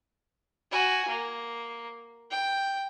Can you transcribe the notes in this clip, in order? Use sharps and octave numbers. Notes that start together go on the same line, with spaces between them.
F#4 G#5
A#3
G5